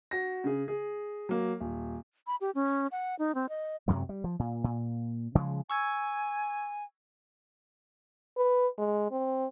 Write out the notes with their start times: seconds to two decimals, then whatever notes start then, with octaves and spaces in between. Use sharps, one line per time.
0.11 F#4 A#6
0.44 C#3 G#4
0.68 G#4
1.29 F#3 A#3
1.60 D#1
2.27 B5
2.41 G4
2.55 C#4
2.92 F#5
3.19 D#4
3.35 C4
3.49 D#5
3.88 F#2 C3 F#3 G#3
4.09 G3
4.24 F3
4.39 A#2
4.64 A#2
5.35 C#3 F3 G3 G#3
5.70 G#5 C#6 E6 G#6
8.37 B4
8.78 G#3
9.11 C4